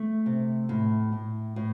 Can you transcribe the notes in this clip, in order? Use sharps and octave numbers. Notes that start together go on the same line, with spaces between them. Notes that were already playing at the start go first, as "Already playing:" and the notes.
Already playing: A3
C3
A2
A2
A2